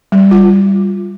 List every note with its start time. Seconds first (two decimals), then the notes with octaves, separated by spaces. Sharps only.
0.12 G3
0.31 F4